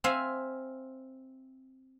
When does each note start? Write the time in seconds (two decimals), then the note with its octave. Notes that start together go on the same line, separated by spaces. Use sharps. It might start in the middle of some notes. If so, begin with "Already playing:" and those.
0.04 C4 E5 F5 G#5